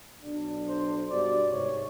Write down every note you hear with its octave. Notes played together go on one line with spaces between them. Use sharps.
B1 D4
C5
G2 B2 D5
G#2 C3 C#5